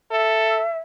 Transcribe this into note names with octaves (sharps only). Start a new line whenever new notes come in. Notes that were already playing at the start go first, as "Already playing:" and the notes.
A4 E5